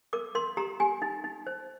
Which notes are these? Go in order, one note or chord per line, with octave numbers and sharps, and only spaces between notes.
A#4 D6
A#4 C6
G4 A#5
G4 G#5
D#4
D#4
C5